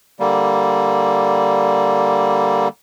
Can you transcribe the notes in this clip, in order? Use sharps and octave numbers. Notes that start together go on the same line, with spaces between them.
D3 G3 A#3